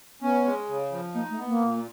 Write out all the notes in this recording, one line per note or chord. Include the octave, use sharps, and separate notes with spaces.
B3 C#4
G#3
C#3
F3
A#3 D#4
A3
B3
A#3
A#2